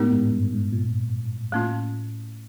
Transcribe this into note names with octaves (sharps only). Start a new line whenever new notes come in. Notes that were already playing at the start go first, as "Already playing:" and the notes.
Already playing: A2 G#3 B3 D#4 G4 A#4
G#2
G2
G#2
A#2
A2 A#3 C#4 F4